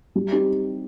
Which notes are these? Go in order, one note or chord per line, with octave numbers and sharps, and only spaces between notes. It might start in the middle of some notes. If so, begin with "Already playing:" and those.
G3
C4 D#4 G4